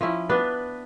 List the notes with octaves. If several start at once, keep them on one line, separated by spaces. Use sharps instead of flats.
F3 C#4 E4
B3 D4 B4